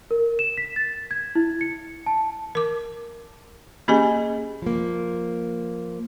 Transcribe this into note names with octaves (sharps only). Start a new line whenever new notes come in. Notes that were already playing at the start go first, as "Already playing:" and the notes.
A#4
E7
B6
A6
G#6
E4
C#7
A5
A#4 D6
A#3 C#4 G4 G#4 D#5 G#5
F3 A#3